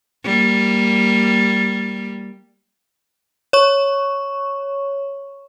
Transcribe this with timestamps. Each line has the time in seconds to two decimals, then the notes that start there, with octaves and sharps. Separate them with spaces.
0.25 G3 A#3
3.53 C#5 C#6